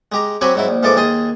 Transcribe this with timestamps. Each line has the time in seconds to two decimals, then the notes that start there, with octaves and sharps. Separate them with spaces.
0.12 G#3 G4 A#5
0.41 F#3 C4 F#4 G4 G#5 B5
0.55 G#2 F#3 E4
0.68 A#1
0.83 G#2 E3 F3 A4 A5 D6
0.97 D#2 G#4 A5 C6 D#6